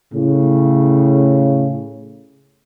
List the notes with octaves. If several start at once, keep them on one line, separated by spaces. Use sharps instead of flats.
A2 C#3